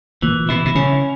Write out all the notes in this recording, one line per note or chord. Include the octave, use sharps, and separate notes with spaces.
A#2 E3
B2 E4
B2
C#3 C#4